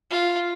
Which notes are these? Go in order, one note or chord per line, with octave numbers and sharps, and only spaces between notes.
F4